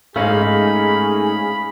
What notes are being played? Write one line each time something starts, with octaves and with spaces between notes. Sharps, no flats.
G#2 A3 C#4 D#4 G#4 F5 B5